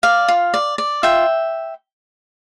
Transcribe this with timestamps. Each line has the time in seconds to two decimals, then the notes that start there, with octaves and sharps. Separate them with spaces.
0.03 D5 F5
0.28 F4
0.54 D5
0.78 D5
1.03 F4 E5 G5